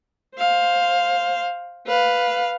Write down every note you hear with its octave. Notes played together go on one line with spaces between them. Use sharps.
C5 F5
B4 F5